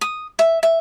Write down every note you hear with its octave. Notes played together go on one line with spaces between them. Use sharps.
D#6
E5
E5